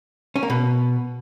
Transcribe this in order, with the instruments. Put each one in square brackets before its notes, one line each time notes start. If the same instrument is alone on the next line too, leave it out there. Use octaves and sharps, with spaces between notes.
[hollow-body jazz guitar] C#4
A#3
B2